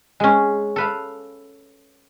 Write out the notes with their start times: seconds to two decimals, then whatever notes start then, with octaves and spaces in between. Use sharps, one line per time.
0.20 G#3 C#4
0.76 A4 B4 F5